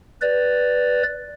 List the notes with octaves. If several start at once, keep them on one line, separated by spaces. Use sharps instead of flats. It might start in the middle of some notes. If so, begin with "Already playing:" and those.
B4 D5